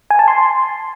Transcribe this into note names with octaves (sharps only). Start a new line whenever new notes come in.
G#5
A5
C6